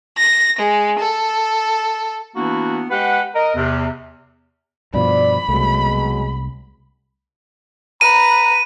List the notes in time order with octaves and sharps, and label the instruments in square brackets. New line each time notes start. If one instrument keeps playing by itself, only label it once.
[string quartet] A#6
G#3
A4
[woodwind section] E3 A#3 B3 D4 E4 F#4
G#3 G4 B4 F#5
A#4 D#5
E2 C3
[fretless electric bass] G2 B2 F3 [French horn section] D5 [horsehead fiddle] B5
[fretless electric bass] C2 A3 [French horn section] B2 F#3 G#3
[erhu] B4 [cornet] A#5 [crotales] D#7